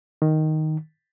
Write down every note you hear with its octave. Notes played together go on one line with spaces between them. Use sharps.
D#3